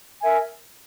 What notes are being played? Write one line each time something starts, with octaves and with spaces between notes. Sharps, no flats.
A#4 E5 G#5